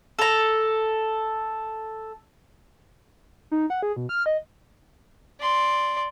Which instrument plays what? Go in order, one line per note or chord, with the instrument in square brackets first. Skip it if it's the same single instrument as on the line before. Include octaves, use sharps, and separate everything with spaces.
[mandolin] A4 A#5
[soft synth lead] D#4
F#5
G#4
B2
F6
D#5
[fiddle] D5 C6